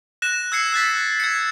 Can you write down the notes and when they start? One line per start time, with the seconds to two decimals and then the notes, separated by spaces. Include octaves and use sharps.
0.22 F#6 A#6 E7
0.52 E6 G#6 C7 C#7
0.72 E6 F#6 A6 B6
1.20 G#6 C#7